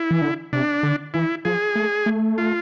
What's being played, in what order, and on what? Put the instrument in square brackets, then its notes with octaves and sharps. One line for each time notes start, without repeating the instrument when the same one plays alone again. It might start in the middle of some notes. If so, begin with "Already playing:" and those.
Already playing: [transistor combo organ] E4
[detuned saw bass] E3
D3
[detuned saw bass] C3 [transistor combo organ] D4
[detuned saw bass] D3
[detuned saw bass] E3 [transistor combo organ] E4
[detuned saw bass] F3 [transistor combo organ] G#4
[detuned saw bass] A3
A3
[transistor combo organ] F4